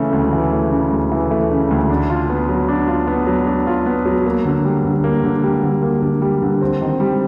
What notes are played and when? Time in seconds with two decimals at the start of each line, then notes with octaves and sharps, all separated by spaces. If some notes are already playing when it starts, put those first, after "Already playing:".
Already playing: C#3 E3 A3
0.13 D2
0.33 E3
0.52 A3
0.72 C#3
0.92 D2
1.12 E3
1.31 A3
1.50 C#3
1.71 D2
1.90 D4
2.10 F4
2.30 B3
2.49 F#3
2.68 D4
2.88 F4
3.07 B3
3.27 F#3
3.47 D4
3.67 F4
3.86 B3
4.05 F#3
4.25 A#3
4.45 D3
4.65 G3
4.85 D3
5.04 A#3
5.24 D3
5.43 G3
5.63 D3
5.83 A#3
6.02 D3
6.22 G3
6.42 D3
6.61 C4
6.81 D#3
7.00 G3